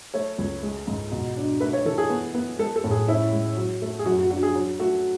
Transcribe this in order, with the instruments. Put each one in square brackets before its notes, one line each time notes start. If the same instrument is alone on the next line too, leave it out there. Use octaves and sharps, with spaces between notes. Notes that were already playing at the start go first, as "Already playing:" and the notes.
[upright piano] A3 C#5
C#2
G#3
G#2
B2
D4
A3 B4
C#5
E3 A4
G#4
B3
B3
G#3 A4
A4
A2
G#4
C#4 E4
G#3
F#3
A3
G#4
F#2 F#4
F#4
D4 F#4
G#4
F#3
A3 F#4